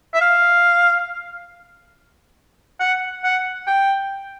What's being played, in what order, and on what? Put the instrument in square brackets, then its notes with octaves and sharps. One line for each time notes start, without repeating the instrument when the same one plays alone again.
[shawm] E5
F5
F#5
F#5
G5